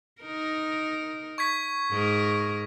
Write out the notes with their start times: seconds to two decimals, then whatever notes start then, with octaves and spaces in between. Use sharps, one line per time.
0.22 D#4 A#4
1.38 C#6 G#6 B6
1.91 G#2 A#4